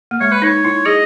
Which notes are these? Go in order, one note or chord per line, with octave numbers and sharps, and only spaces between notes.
A#3
G#3 C#5
B4
D#4 C#5
E4
G#4 D#5